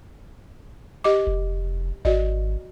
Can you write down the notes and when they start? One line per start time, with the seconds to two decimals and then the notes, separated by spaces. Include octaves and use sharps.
1.04 G4 D#5 D6
1.27 F1
2.05 G#1 F#4 D5 D#5